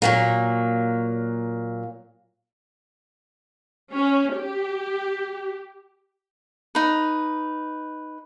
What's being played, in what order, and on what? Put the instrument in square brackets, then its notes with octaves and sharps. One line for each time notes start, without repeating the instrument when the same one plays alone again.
[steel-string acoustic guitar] A#2 F#3 A#3
[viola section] C#4
G4
[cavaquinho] D#4 B4